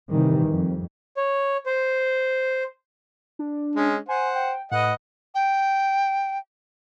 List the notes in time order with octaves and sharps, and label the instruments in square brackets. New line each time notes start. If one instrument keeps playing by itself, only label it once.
[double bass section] C3 D#3 E3 G3
F2
[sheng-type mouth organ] C#5
C5
[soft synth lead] D4
[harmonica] G#3 C#4
[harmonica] C5 F#5 [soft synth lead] G#5
[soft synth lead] G5
[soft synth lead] A2 [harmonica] B4 D#5 F#5
[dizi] G5